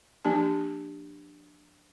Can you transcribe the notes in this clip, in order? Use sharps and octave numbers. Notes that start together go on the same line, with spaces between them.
F3 A#3 D4 G4 A5